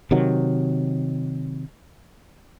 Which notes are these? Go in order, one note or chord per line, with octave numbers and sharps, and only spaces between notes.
C3 D#3 F#3